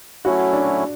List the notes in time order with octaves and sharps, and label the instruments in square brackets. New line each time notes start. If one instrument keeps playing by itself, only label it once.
[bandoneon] F#3 A3 C#4 E4 [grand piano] F#4
[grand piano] D4